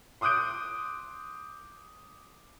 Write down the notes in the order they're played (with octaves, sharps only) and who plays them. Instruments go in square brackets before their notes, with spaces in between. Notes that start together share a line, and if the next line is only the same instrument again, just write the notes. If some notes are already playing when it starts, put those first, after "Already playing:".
[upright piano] C6 D6 D#6 F#6 G6 D7